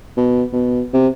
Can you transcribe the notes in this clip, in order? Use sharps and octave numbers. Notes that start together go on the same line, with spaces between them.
B2
B2
C3